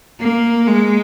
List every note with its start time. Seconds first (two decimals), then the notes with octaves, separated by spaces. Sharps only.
0.21 A#3
0.67 G#3